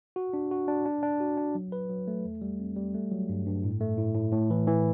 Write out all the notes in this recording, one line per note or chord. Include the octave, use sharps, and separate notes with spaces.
F#4
D4
F#4
D4
D4
D4
F#4
D4
F#3
B4
F#3
A3
E2
G3
C4
G3
A3
F#3
G2
G2
A2
A3
A2
A2
A2
E3
E3